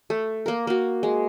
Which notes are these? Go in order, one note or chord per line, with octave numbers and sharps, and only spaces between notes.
A3
A#3 A#4
A#3 F#4
G#3